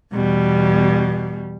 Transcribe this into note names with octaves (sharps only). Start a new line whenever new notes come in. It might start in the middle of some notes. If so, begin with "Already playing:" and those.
E2 B2 G3